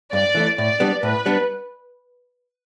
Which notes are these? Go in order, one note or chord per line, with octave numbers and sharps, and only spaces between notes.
G2 D5
E3 A3 E4
A2 D5
G3 B3 D4
A2 B4
G3 B3 D4